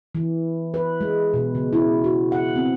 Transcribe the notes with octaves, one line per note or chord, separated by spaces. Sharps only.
E3
B4
G#3
B2
C#3
E4
F#4
F#5
C4